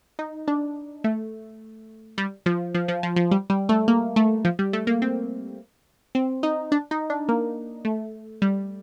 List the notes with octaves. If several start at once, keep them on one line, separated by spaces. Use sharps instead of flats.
D#4
D4
A3
G3
F3
F3
F3
F3
F3
G3
G3
A3
A#3
A3
F3
G3
A3
A#3
C4
C4
D#4
D4
D#4
D4
A#3
A3
G3